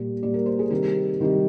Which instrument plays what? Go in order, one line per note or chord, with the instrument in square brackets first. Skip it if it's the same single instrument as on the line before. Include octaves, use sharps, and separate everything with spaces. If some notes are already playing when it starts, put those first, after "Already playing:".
Already playing: [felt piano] A#2 G3
A#2 G3 D5
A#4
C5
G#4
C3 D#3 G3 A#4
C3 D#3 G3